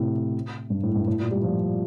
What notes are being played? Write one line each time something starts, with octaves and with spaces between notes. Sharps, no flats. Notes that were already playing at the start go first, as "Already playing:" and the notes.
Already playing: A2 C3
G2
A2
G2
A2
A#2
G3
F3